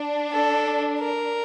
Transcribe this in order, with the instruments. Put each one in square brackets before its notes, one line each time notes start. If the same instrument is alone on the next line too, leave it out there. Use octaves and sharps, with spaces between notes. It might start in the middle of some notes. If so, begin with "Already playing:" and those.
Already playing: [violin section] D4
[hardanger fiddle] A4
A#4